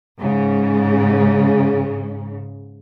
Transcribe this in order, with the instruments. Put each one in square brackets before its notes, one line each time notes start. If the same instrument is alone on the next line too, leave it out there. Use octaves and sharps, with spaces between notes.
[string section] G#2 C#3